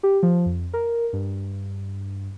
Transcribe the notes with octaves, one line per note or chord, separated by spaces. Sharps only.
G4
F3
F2
A#4
G2